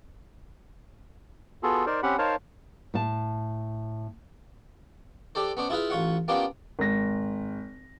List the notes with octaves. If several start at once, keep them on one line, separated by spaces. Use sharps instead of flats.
B3 F4 F#4 G#4 A4
D#4 A#4 C5 D5
C4 C#4 G4 F#5 B5
D#4 A#4 C5 C#5 F5 A5
A2 A5
D4 G4 A4 C5
B3 C#4 D4 C5
E4 F4 G#4 B4 F5
A1 F4 C#5 F#5
A#3 B3 C#4 D4 F4 G4
G#1 A#6